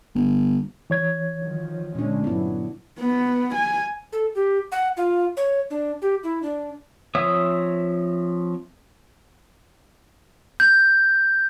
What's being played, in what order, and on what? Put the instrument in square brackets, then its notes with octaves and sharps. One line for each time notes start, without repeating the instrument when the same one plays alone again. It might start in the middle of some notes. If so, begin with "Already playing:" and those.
[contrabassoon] G1
[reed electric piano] E3 C#5 G#6
[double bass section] D#3 F3 F#3
[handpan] A#2 D4 [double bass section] D3 G#3 C#4
[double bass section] G1 F#3 [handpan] B3 E4
[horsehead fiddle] B3
G#5
[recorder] A4
G4
F#5
F4
C#5
D4
G4
E4
D4
[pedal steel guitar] F3 C4 C#5 E5 D#6
[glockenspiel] G6